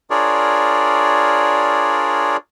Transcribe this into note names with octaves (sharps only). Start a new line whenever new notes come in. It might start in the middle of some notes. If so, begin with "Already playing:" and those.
D4 F4 G#4 A#4 C#5 D5